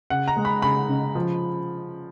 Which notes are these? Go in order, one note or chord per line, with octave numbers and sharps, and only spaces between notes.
C#3 F#5
A#5
G#3
B5
C#3 B5
C#3
F3